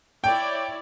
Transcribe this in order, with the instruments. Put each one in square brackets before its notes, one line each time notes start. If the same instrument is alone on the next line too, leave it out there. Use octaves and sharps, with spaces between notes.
[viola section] E4 C#5 D5 [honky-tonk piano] G5